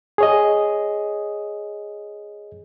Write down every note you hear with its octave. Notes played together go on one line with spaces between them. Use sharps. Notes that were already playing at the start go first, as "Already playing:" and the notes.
G#4 C#5 D#5